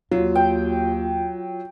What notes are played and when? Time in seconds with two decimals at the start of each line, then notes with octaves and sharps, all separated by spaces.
0.11 D#2 F#3 F4
0.35 G5